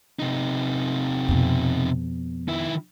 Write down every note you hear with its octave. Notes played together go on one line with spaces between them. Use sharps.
C3 D#4
F2 B2
D#3 E4